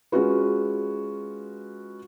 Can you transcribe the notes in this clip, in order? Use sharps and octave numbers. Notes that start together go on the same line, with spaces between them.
G#3 C#4 F4 F#4 B4